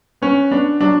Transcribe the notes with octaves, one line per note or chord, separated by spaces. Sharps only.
B3 C#4
B3 D4
F#3 D4